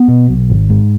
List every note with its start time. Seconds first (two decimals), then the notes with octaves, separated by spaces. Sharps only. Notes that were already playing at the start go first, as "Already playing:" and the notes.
Already playing: B3
0.08 B2
0.29 B1
0.50 G#1
0.70 G#2